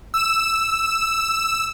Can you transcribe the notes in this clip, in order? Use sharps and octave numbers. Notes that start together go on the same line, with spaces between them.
E6 E7